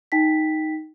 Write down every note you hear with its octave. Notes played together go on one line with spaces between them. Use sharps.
D#4 G5 B6